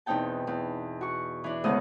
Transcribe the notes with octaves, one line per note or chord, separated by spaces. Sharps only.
E2 B2 C4 D#4 G5 A5
E2
F#4 C#6
E3 D4
D2 G#2 C#3 B3 D#5